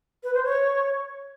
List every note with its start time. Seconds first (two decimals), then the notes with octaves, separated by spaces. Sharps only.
0.23 B4
0.34 C5
0.44 C#5